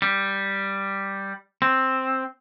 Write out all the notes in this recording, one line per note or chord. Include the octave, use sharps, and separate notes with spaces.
G3
C4